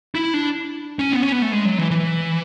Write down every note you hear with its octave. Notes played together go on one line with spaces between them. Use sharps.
E4
D4
C#4
B3
C#4
B3
A3
G#3
F#3
E3
E3